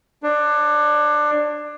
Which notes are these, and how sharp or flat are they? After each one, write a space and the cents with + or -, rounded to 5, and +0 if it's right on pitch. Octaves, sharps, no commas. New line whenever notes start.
D4 +20 C#5 -20